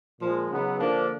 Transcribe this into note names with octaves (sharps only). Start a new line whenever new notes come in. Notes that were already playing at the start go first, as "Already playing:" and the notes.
A#2 F3 G#3
C#3 F#3 B3 D#4
D3 F3 A#3 D4